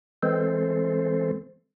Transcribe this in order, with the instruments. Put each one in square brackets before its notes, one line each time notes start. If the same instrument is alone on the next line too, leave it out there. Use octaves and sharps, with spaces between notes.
[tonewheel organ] E3 G#3 C4 A4 C5